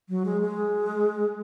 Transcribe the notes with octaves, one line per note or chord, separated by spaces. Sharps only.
F#3
G#3
G#3